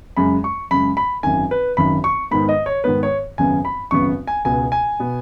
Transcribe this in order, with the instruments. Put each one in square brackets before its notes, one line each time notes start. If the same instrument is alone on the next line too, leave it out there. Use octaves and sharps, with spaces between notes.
[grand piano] F#2 C#3 G#3 B5
C#6
F#2 C#3 G#3 B5
B5
G#1 F#2 D#3 G#5
B4
G#1 F#2 D#3 B5
C#6
G#2 D#3 B3 B5
D#5
C#5
G#2 D#3 B3 B4
C#5
G#1 F#2 C#3 B3 G#5
B5
G#1 F#2 C#3 B3 C#6
G#5
C#2 B2 B3 G#5
G#5
B2 B3